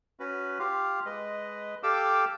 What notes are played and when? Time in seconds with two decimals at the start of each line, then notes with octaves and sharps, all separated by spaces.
0.20 C#4 F#4 B4
0.59 F4 G4 F5
1.06 G#3 B4 D#5
1.83 G4 A4 F5 G5 D6 E6